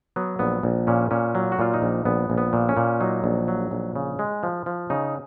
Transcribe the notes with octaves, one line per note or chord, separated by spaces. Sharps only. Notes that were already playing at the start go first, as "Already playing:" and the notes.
F#3 B3
A#1 B3
A#1
A#2 C#4
A#2 C#4
F#3
F4
F#4
A#2 F4
D#4
A#1
A#1 B3
A#1
B3
A#2
C#4
A#2
F#3 D#4
A#1
F#3
A#1
C#3
G#3
F3
F3
C#3 D#4